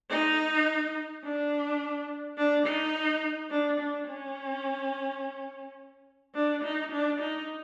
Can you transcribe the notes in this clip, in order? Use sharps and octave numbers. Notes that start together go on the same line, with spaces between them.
D#4
D4
D4
D#4
D4
D4
C#4
D4
D#4
D4
D#4